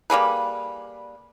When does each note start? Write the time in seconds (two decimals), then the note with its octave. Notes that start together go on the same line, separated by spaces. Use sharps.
0.10 G3 A#3 G#4 B4